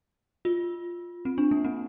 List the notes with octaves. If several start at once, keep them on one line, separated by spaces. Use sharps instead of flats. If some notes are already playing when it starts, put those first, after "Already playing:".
F4
C4
D4
A#3
C4